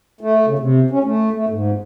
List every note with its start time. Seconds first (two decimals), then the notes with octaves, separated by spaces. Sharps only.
0.21 A3
0.47 C#3
0.59 C3
0.91 C#4
1.04 A3
1.32 A3
1.49 G#2